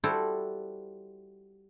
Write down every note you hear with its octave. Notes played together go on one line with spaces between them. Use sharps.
G3 E4 F#4 A4 C5